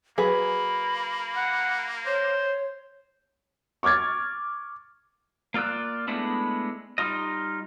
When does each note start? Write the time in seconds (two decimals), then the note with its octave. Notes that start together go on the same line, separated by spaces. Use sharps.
0.18 F#3 A#3 G#4 B4 B5
1.36 F#5
2.06 C5 C#5
3.83 C#6 D6 F6 G#6 A6
5.54 A#3 F4 D5 E6 F#6
6.08 G#3 A3 B3 D4 E4
6.98 G3 D#4 F4 D#5